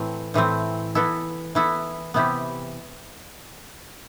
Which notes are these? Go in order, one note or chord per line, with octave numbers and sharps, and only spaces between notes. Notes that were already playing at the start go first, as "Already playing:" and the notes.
Already playing: A2 E3 A3 C4
A2 E3 A3 C4
E3 B3 E4 A4
E3 B3 E4 A4
C3 E3 B3 E4 G4